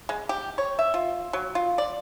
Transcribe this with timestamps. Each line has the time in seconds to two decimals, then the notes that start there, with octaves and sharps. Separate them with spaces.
0.09 G#3
0.29 G4
0.58 C#5
0.79 E5
0.94 F4
1.33 F#3
1.55 F4
1.78 D5